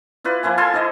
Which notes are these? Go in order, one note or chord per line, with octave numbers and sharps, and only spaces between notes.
E4 F4 B4 D5
F3 A#3 E4 G#5
E4 A4 G#5 C6
D#4 C5 D5 D#5